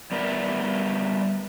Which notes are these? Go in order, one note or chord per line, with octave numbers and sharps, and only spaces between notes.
G3 B3 A#4 D5 E5